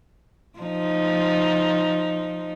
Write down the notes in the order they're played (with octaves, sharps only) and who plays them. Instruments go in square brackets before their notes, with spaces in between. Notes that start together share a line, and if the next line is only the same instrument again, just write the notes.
[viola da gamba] F3 D#4